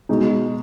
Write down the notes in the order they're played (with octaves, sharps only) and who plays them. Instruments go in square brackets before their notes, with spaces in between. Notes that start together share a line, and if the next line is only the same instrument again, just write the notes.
[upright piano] B2 G#3 D#4